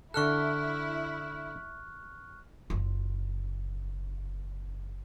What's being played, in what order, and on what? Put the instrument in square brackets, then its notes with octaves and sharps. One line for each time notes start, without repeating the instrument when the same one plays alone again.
[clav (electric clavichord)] D3 A4 [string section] E4 [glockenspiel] C#6 F6 F#6
[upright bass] F#1 F4